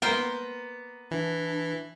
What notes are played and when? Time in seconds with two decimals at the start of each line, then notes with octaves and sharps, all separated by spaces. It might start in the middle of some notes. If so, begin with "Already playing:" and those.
0.02 A#3 B3 A#4 C5 G5
1.11 E3 D4